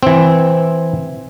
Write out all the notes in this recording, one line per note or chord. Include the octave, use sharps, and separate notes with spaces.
E3 C4